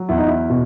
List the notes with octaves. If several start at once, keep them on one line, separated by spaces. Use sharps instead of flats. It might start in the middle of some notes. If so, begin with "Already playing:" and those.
Already playing: F#3
E2 E4
D#4
E4
B2